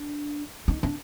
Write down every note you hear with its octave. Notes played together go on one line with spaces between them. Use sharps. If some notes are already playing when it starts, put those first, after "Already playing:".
Already playing: D4
D#4
D4